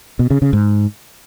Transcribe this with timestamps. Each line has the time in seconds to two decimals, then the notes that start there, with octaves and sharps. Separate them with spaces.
0.19 B2
0.31 C#3
0.42 C#3
0.53 G#2